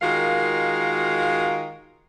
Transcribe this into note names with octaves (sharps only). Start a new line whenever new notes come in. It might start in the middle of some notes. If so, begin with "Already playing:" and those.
D#3 G#3 F4 F#4 A#4 F5